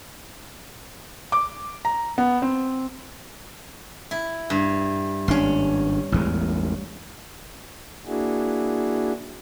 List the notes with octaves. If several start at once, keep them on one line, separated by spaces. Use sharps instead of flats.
D6
A#5
B3
C4
E4
G2
G#1 C#4 D4 C6
A1 E2 G#3
A#3 D4 E4 F#4 G#4